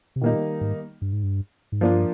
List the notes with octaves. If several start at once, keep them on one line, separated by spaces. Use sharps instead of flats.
C3
A#2 D#3 G3 A#3 D#4
G#2
G2
G#2
G2
G#2
G2 F3 A#3 D4 F4